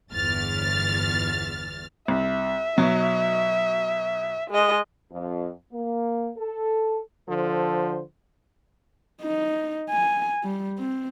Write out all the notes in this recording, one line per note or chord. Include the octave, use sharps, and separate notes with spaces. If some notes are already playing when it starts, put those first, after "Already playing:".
G1 E2 F6 A6
C2 E5
B2 F#3 D#4
G#3 D#5
F2
A#3
A4
D3 F3 A4 C5
D#4
G#5
G3
C4